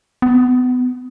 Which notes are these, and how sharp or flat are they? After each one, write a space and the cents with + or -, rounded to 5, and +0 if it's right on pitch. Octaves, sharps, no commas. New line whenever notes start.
B3 +25